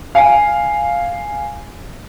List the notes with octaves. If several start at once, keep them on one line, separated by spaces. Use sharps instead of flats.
F5 G#5